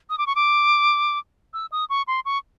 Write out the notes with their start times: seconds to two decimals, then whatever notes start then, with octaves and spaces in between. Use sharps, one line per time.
0.10 D#6
0.18 D6
0.27 C#6
0.36 D6
1.54 E6
1.72 D#6
1.90 C#6
2.08 C6
2.25 C#6